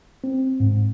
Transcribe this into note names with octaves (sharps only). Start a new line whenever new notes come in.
C4
G#2